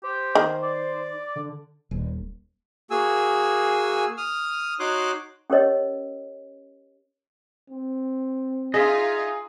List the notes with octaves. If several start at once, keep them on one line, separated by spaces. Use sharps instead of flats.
G4 C5
D#3
D5
D3
D#1
A#3 F#4 G#4 G#5 E6
D#6 F6
D#4 F#4 C#5 C6 D6 F#6
C#4 G4 A#4 C#5 D#5
C4
D#4 F4 G#4 D#5 E5